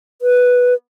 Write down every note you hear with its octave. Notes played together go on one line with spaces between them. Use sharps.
B4